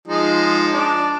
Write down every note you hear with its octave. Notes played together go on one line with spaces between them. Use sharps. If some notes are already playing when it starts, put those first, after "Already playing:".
F3 G#3 D#4
D4